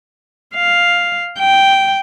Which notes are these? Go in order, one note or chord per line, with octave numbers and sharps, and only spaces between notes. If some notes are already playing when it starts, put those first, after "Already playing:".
F5
G5